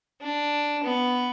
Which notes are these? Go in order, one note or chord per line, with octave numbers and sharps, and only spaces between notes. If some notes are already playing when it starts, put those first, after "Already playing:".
D4
B3